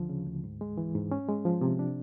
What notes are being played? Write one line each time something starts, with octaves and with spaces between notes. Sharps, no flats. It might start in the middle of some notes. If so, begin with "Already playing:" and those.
Already playing: D2 D3 F3
C#3
D2
G#2
G#3
E3
G#2
C#4
G#3
F3
C3
D4